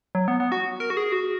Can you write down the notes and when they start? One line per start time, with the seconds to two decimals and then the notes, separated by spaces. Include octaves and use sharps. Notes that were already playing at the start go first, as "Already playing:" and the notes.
0.15 F#3
0.28 B3
0.40 B3
0.52 F#4
0.80 A#4
0.90 F#4
0.97 G#4
1.12 F#4